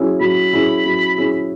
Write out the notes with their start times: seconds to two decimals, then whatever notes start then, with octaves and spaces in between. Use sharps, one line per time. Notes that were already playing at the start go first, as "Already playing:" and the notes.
Already playing: F#3 C#4 E4 G#4
0.21 F#3 B5
0.53 C#4 E4 G#4
0.85 F#3
1.17 C#4 E4 G#4